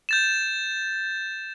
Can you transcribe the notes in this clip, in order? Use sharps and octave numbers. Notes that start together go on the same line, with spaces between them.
G6 A6 E7